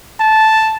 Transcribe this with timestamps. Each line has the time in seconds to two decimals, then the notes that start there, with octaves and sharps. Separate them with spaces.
0.20 A5